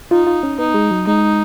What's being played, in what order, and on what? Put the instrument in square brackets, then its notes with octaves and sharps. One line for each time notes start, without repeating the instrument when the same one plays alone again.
[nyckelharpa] D#4 [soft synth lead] F4
[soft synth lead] F4
C#4
[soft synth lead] B3 [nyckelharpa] D#4
[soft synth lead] G#3
F#3
[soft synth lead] G#3 [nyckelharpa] D#4